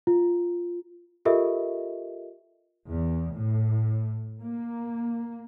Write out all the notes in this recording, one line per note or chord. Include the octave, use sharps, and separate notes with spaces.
F4
F4 G4 A4 A#4 D#5 E5
E2
A2
A#3